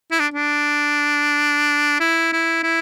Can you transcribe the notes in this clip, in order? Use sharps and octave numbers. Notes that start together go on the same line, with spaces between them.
E4
D4
D4
E4
E4
E4